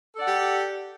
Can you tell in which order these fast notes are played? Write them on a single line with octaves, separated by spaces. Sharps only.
A4 D5 F#5 G4